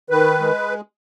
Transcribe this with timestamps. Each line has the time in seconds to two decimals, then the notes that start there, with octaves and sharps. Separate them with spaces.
0.10 D#3 B4
0.40 G#3